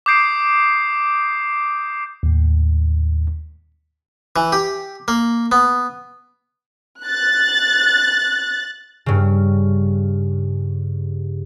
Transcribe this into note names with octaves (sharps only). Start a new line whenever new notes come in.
D6 D#6 G6 C7 D7
D#2 A2
E3
G4
A#3
B3
F#6 A6
G2 C#3